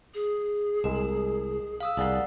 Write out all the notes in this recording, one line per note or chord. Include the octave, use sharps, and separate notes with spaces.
G#4
C2 G#3 A#4
F5 D#6 E6
C2 G#4 A#4 D5 F5 F#5